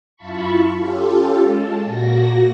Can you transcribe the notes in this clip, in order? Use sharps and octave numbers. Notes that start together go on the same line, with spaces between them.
F#2 E4 F4 A5 B5 C#6
C#4 F4 G4 A4
G#3 A5
A#2 A#3 F#4 A#6